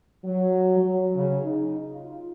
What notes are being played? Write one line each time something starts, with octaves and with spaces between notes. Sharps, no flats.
F#3
F#3
C#3
D#4
F4